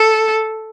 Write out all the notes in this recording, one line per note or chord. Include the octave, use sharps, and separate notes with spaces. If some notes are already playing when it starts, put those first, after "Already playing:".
Already playing: A4